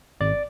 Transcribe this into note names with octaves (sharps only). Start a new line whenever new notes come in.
G#1 D5